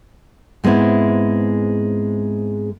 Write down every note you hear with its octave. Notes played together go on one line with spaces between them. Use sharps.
G#2 G#3 B3 C4 E4